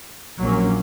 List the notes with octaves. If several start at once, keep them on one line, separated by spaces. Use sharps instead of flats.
A#1 A#2 F#3 A#3 C#4